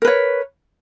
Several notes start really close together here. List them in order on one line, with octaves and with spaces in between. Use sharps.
A#4 B4 C#5